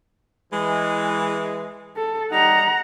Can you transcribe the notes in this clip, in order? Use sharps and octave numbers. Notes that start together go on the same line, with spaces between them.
E3 G#3
A4
G3 D#4 F#5 A#5